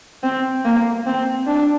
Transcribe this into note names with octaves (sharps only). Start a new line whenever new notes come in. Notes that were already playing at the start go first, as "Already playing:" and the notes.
C4
A#3
C4
D4